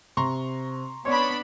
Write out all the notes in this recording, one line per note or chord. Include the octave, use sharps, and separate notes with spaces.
C3 A#5 C6 C#6
B3 C#4 D4 C#5 D5 B5 C6